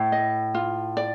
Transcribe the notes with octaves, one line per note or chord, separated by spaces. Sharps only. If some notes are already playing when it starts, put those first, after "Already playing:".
Already playing: A2
D#5
F4
D5